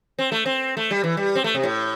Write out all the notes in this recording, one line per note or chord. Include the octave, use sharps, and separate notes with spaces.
C4
A3
C4
A3
G3
E3
G3
C4
A3
C3
A2